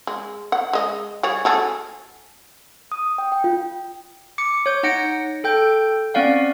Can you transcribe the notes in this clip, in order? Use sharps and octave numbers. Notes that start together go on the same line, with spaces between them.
G#3
F#5
G#3 D#5
G3 G#4 C#5
F#4 G#4 A4
D#6
G5
G5
F4
D6 C#7
C#5 G6
D#4 F#5 A#6 C#7 D7
A4 G5 G6
C4 C#4 D5 F5 F#5